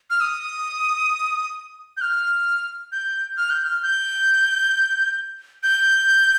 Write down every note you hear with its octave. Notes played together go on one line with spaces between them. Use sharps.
F6
D#6
G6
F6
G6
F6
G6
F6
G6
G6